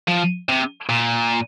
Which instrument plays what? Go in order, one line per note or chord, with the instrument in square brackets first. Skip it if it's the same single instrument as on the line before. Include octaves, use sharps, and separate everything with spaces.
[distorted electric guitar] F3
C3
A#2